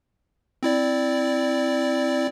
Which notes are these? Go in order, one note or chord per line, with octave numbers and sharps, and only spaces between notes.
C4 E4 D5